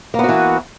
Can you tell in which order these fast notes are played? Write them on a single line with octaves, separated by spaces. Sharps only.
A#3 B3 F#4 E3